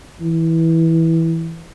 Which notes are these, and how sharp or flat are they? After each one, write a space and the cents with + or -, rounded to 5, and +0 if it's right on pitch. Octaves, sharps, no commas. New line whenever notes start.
E3 -10